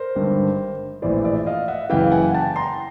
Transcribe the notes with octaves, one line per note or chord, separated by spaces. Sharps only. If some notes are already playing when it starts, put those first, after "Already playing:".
Already playing: A#4 C5
G#1 G2 D3
A#1 A2 E3 C5 D5
D5 E5
D#5 F5
E5 F#5
F#1 F#2 C#3 E3 F5 G5
F#5 G#5
G5 A5
A#5 C6